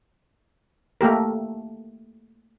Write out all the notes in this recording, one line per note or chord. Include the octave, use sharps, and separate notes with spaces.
A3 A#3 G4 A#4